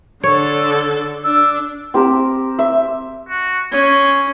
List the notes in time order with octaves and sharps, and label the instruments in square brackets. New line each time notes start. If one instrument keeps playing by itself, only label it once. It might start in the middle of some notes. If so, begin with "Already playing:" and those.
[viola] D3 A4 [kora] C#5
[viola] D4 [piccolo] E6
[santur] C4 G4 A#4
E5
[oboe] F#4
[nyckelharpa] C#4 [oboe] G#4